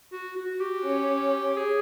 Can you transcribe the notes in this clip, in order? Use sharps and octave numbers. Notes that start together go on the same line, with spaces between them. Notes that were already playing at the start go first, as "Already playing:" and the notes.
F#4
F#4
G4
C#4
G#4